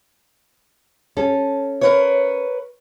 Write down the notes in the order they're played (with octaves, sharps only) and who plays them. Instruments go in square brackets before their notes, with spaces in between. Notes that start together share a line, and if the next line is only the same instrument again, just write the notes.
[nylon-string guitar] C#4 A4
[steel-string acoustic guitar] A#4 B4 C#5